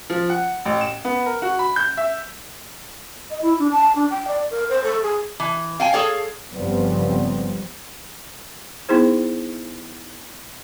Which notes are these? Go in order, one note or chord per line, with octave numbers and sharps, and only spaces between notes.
F3
F#5
A1
E7
B3
A#4
F#4
B5
G6
E5
D#5
E4
D4
A5
D4
G5
D5
A#4
C5
A4
G#4
E3
F5 G5 G#5
G#4 A4 C#5 F5
G1 C#3 F3 G3 B3 C4
B3 D#4 E4 G#4 C5